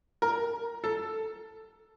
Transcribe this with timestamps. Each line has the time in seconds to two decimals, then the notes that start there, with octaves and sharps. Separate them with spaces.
0.22 A#4
0.84 A4